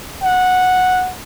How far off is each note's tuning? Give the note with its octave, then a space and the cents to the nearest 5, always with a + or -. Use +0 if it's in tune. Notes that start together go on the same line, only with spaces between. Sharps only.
F#5 -10